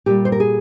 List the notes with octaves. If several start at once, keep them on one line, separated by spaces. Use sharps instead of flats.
A#2 G3 G4
C5
A#4
G#4